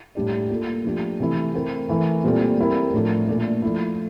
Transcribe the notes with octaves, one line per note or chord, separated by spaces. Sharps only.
A2 G3 D4 G4 D5
A#3 F4 A4
F3 A3 D4 G4
C3 E3 A3 E4
A3 C4 E4 A#4
E3 A3 E4 A#4
A#2 G3 C4 F4 A4
G3 C4 E4 A#4
A2 F3 A3 D4 A4
A#2 A3 D4 A4 D5
F3 A3 E4